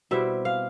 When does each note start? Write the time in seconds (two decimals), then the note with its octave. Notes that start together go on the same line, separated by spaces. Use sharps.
0.11 B2 G3 C4 E4 E5
0.45 F5